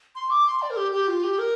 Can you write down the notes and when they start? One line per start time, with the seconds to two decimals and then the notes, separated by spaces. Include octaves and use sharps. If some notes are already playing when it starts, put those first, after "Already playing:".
0.15 C6
0.30 D6
0.46 C6
0.62 D5
0.70 A#4
0.77 G4
0.92 G4
1.08 F4
1.24 G4
1.39 A#4